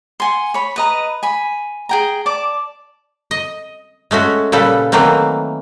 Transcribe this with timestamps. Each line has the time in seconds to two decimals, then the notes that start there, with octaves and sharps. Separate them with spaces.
0.20 F#5 G#5 C6
0.54 C#5 B5
0.76 B4 D#5 A#5
1.23 G#5 B5
1.89 G#4 G5 A#5
2.26 D5 A5 D6
3.31 D#5
4.11 G#3 A3 C#4 F#4
4.52 A#2 C#3 G3 A4 B4
4.92 D#3 E3 F#3 A3 A#3 C4